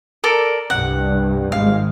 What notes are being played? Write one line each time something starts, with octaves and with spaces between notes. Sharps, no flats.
A4 A#4 D5
C2 G2 F#5
G#1 G#2 G#3 F5